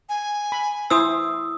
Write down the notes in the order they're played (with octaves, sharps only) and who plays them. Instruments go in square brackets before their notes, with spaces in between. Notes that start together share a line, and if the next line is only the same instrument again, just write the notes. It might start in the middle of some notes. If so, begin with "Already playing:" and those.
[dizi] G#5
[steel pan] B5
[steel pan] E4 C5 C6 [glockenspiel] D#6 E6